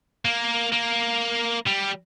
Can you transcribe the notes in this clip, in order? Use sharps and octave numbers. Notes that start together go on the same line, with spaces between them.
A#3
A#3
G3